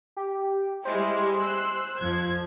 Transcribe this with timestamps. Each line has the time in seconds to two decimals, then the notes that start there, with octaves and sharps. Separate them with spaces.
0.17 G4
0.85 G3 G#3 E4 C5
1.40 C6 E6 F#6
1.99 F2 F3 G#6